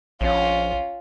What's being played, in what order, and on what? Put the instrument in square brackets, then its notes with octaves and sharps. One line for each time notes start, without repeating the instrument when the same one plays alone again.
[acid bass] A#1 [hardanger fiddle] C#4 F4